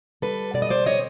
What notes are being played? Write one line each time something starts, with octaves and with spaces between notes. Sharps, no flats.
G3 A4 B4
B2 D5
D#5
C5 D5
C4 C#5 D#5